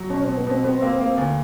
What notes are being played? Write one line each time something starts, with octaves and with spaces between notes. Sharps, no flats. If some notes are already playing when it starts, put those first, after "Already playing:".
Already playing: F#3
B2 C#4
B2 C4
B3
B2 C4
B3
A#3
A#3
D2